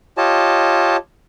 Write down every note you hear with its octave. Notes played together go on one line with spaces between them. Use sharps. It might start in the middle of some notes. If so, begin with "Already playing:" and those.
F4 G4 C#5 D#5 A5